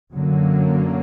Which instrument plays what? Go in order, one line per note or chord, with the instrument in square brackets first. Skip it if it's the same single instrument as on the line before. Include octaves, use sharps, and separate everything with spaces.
[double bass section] F#2 D3 F#3 A#3